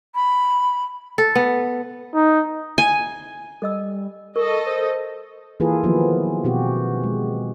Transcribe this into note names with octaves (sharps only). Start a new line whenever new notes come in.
B5
A4
B3
D#4
G#5
G3 A4 D#5 E6
A4 A#4 D#5 C#6
C5
E3 A#3 F4 G#4 A4 B4
D#3 F3 F#3 A#3 B3
B2 C4 F#4 G4
G#3